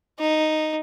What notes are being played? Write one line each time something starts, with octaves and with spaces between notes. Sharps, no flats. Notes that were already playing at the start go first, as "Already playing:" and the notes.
D#4